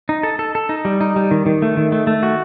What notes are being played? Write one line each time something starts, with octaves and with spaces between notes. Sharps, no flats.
D#4
A4
A4
A4
D#4
G3
D#4
G3
D#3
D#3
A3
D#3
A3
A3
F#4